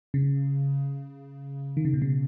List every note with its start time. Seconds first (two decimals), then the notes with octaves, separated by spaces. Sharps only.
0.14 C#3
1.77 D#3
1.85 C#3
1.94 B2
2.02 C#3